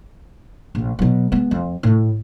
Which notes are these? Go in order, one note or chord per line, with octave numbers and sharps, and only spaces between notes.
A#1
B2 F#3
G#3 B3
F2
A2